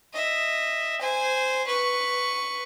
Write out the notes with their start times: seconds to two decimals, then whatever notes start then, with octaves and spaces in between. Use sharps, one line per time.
0.13 D#5 E5
1.01 C5 G#5
1.67 B4 C#6